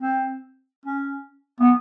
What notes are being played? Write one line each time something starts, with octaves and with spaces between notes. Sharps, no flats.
C4
C#4
B3